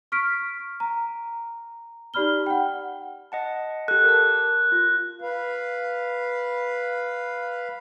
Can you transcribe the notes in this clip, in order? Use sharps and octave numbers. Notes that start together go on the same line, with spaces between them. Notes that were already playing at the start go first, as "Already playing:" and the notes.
C#6 F6 B6 D7
A#5
D#4 G4 D5 B5 F6 G7
F#5 G5
D#5 F#5 A5
G4 A4 F#6
A#4 A5
F4
B4 F5